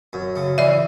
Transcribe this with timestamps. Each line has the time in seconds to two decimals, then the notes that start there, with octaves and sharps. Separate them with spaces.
0.13 F#2
0.36 C#3
0.58 E3 D5 E5